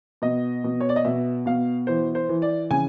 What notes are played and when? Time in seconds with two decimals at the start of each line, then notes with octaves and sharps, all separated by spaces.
0.22 B2 D#5
0.64 B2
0.81 C#5
0.89 D5
0.96 D#5
1.04 B2 E5
1.46 B2 F5
1.87 E3 C5
2.15 C5
2.29 E3
2.42 D5
2.71 C#3 G#5